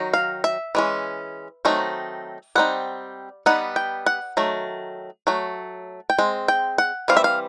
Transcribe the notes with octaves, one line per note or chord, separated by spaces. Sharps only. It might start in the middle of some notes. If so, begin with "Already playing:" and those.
Already playing: D#3 F#3 D#4
F5
E5
E3 G#3 C#4
D#3 F#3 A3 C4 D#4
G3 C4 D#4 F#5
G3 B3 D#4 F#5
G5
F#5
D#3 F#3 A3
F#3 A3
G5
G#3 C4
G5
F#5
E3 G3 C4 F5
E5
F5